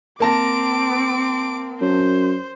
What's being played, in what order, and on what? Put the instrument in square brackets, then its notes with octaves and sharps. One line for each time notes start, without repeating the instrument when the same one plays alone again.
[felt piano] A#3 A5 A#6 [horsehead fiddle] C4 [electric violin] D6 D7
[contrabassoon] F#2 [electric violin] C5